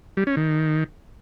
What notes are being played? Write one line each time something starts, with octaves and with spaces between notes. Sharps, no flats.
G3
C#4
D#3